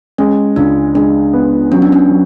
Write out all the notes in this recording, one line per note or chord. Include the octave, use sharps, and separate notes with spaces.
G#3 C#4
C#2 D4
G#3 D4
B3
F#3 C#4
D4
C#4
F#3